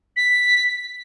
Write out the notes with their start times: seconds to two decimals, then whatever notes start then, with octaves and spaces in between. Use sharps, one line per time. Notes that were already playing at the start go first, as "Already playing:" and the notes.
0.17 B6